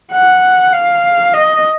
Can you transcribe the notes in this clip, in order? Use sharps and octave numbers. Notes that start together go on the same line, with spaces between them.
F#5
F5
D#5